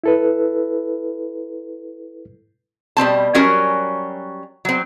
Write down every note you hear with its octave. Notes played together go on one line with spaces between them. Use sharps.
E4 A4 B4
B2 G3 C4 A5
F#3 G3 C#4 F#4 A#4 G#5
F#3 C4